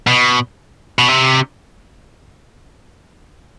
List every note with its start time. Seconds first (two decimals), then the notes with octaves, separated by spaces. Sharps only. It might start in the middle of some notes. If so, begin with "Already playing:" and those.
0.07 B2
0.99 B2
1.08 C3